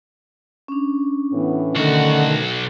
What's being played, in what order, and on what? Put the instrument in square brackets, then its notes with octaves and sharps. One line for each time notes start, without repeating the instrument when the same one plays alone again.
[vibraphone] C#4 D4
[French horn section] A2 E3 B3
[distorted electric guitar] B1 F#4 [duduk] D3 [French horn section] D#3 A3